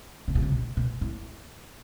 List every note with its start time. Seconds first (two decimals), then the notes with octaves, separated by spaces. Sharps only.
0.28 C#3
0.35 B2
0.42 C#3
0.52 B2
0.77 B2
1.01 A2